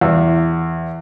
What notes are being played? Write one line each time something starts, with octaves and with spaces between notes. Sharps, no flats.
E2